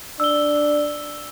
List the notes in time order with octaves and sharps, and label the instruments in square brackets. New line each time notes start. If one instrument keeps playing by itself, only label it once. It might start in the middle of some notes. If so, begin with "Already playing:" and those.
[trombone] D4 [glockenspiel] E6 G7